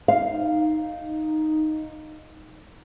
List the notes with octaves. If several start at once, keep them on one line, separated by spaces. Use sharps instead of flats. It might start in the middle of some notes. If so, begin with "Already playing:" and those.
D#4 F5